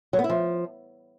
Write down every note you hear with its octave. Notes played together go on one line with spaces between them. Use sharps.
F#3
B3
E4
F3